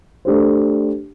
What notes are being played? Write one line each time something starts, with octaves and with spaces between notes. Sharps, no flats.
A3 D4 G4 C5